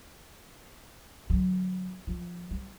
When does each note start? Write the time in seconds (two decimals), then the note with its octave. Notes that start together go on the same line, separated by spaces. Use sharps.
1.30 D3 F#3
2.07 F3
2.51 G3